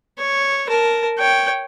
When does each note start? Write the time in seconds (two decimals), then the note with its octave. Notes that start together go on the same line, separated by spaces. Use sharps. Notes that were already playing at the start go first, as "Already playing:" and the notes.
0.18 C#5
0.69 A#4 A5
1.18 C#5 G5